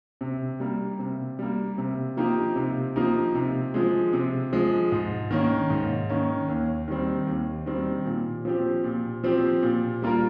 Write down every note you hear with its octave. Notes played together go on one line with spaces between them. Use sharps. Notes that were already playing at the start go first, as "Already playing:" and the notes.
C3
G3 A#3
C3
G3 A#3
C3
F3 A#3 D#4 G4
C3
F3 A#3 D#4 G4
C3
F3 G#3
C3
F3 G#3
G#2
D#3 A#3 C#4
G#2
D#3 A#3 C#4
D#2
D#3 G3 C4
D#2
D#3 G3 C4
A#2
F3 C4 G4
A#2
F3 C4 G4
A#2
G3 A#3 F4 A#4